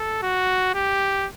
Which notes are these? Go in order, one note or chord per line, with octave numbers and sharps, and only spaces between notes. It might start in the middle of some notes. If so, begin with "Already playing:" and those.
Already playing: A4
F#4
G4